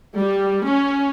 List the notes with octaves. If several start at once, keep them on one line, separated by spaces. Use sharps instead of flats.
G3
C#4